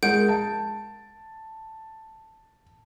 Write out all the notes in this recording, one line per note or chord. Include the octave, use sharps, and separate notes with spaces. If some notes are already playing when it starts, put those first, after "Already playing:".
G#3 A#4 F#5 G6 D7
A5